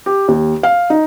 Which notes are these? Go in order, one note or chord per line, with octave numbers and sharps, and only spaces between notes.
G4
D#2
F5
D#4